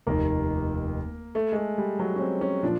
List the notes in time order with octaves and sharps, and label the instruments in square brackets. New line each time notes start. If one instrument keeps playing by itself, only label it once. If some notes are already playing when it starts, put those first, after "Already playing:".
[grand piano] F1 D#2 D#3 [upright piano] A#3
[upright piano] A3
G#3
A3
G3
F#3
C#4
C4
C#4
[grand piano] A#2 F3 [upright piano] D4